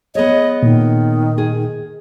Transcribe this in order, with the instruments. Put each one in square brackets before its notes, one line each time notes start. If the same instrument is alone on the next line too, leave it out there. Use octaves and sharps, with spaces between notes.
[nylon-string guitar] B3 G#4 C#5 [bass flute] D#5
[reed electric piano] A#2 [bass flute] D#3
[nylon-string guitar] G#4